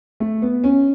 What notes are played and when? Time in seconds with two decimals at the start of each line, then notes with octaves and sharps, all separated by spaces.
0.20 A3
0.42 B3
0.64 C#4